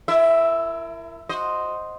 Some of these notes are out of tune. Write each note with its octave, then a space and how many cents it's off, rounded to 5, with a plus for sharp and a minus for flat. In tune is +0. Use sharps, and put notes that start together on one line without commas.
E4 +35 A#4 -10 E5 +0
F#4 -15 C5 +0 D#5 +0